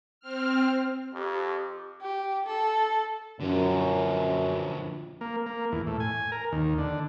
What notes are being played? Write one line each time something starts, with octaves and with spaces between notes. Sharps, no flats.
C4 F6
F2 G4
G4
A4
F#2 D3 F3
A#3
A#3
E2
A2
G#5
A#4
D#2
D3